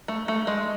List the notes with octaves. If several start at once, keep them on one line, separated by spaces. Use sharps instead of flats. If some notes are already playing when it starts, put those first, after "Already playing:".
A3
A3
G#3